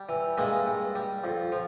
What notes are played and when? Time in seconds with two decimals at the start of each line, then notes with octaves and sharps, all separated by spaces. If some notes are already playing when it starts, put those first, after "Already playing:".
Already playing: G3
0.09 E3
0.38 G2 G#3 A#3
0.66 G2
0.95 G3
1.24 F2
1.52 F3